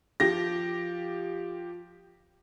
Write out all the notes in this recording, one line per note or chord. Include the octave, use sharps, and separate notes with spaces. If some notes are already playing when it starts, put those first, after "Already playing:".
F3 G4 A#6